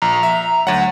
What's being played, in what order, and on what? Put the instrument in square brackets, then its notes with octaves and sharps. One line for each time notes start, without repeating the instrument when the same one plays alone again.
[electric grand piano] A#1 [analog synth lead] A#5
[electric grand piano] E5
[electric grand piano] D2 F#5 [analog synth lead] F#3